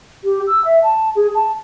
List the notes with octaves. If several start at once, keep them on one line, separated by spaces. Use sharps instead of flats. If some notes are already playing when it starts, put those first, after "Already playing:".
G4
E6
E5
A5
G#4
A5